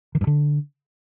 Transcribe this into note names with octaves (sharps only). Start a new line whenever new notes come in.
D#3
G2
D3